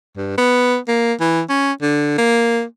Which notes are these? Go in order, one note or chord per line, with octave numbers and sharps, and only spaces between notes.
G2
B3
A#3
E3
C#4
D3
A#3